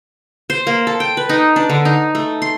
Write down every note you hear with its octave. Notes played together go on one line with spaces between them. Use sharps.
C5
A#3
A4
G5
B4
D#4
D4
D3
D#4
A3
C6